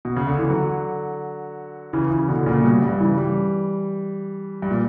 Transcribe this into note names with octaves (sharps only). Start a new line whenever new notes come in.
B2
C#3
D3
E3
D3 F#3
C#3 E3
C#3 E3
B2 D3
A#2 C#3
G2 B2
G2
C#3 E3
E3 G3
G2
A#2